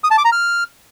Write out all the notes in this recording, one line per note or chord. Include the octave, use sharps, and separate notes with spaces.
D#6
A5
D6
A#5
F6